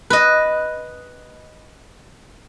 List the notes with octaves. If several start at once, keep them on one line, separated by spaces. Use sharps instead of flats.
B4 D#5